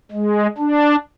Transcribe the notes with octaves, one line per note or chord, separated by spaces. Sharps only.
G#3
D4